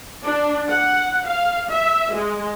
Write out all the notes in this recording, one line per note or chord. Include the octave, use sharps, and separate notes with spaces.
D4
F#5
F5
E5
G#3